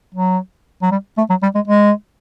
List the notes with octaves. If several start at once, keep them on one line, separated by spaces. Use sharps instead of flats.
F#3
F#3
G3
A3
F#3
G3
G#3
G#3